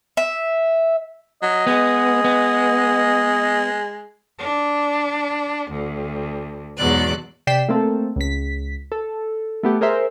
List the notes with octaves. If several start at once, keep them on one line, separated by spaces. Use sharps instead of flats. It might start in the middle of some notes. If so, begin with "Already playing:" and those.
E5
F#3 D#5
G#3 B3
B3
D4
D2
E2 G#2 B2 F#3 D5 F#6
C3 D5 G5 B6 C7 E7
A3 A#3 C4 A4
C#2 B6
A4
A3 B3 G4
G#4 A#4 C5 E5